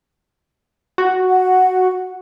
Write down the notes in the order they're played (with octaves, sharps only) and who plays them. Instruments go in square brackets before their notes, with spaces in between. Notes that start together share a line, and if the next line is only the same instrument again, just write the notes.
[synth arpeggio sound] F#4
[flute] F#5